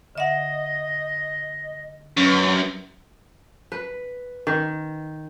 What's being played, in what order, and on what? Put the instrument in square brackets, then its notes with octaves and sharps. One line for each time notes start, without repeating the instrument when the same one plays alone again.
[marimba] D3 E5 F#5 [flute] D#5
[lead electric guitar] F#2 [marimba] C#4 B4
[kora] B4
D#3